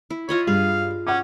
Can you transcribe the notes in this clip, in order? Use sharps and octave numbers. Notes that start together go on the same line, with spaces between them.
E4
F4 C#5 D#5 B5
G2 G#4 F5
C#4 F#5 D6